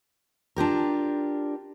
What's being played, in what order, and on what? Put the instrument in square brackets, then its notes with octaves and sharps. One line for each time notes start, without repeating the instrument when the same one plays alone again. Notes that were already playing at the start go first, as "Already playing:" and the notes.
[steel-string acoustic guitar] D4 F4 G4 A#4